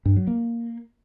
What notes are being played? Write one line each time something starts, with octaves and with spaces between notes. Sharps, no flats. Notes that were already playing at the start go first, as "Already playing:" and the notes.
G2
F#3
A#3